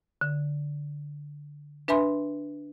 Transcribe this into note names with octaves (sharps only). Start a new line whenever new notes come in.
D3
D4 B4 E5 G#5 B5 C6